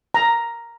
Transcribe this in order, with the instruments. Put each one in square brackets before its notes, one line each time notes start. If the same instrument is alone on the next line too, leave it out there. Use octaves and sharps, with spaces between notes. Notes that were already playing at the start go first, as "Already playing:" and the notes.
[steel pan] A#5